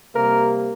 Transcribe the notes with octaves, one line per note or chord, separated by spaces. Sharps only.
C3 G3 A#3 A#4